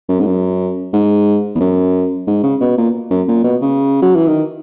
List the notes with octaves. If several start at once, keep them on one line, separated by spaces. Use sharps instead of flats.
F#2
G#2
F#2
G#2
E2
F#2
G#2
C#3
B2
A#2
F#2
A#2
B2
C#3
F#3
E3
D#3